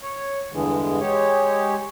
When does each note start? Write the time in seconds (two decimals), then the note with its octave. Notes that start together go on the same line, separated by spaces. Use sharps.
0.02 C#5
0.53 E2 G2 D3 E3 G#3
1.00 G#3 G4 C#5